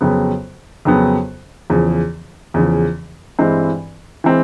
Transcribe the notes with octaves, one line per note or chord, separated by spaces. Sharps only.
F2 C#3 F#3 B3
F2 C#3 F#3 B3
E2 C#3 F3
E2 C#3 F3
G2 E3 G#3 C4
E3 G#3 C4